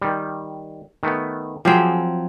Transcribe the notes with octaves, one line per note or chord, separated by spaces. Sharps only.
D#3 G3
D#3 A3 B3
F3 F#3 C4 G4 G#4